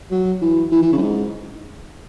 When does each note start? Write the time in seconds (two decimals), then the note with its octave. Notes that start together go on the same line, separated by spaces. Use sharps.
0.11 F#3
0.41 E3
0.72 E3
0.82 E3
0.92 C#3
0.98 F#2
1.02 G#2